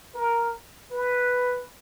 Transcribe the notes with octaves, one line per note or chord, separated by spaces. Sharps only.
A#4
B4